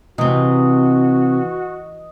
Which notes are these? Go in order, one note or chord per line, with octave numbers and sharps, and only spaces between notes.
C3 E3 C4 F#4 D#5